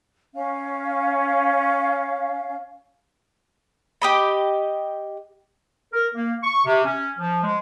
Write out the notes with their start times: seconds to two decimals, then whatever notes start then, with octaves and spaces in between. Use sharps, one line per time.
0.34 C#4 F5
4.02 G4 D#5 B5
5.93 A#4
6.15 A#3
6.44 C#6
6.66 C3
6.85 C#4
7.19 F3
7.44 G#3